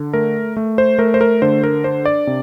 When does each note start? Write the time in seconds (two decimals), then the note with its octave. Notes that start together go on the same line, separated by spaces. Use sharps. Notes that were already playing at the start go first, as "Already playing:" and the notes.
Already playing: D3
0.13 A3 A#4
0.57 A3
0.78 C5
0.98 A3 A#4
1.14 C5
1.21 A#4
1.42 D3 C5
1.63 A#4
1.84 D4 C5
2.05 D5
2.27 C3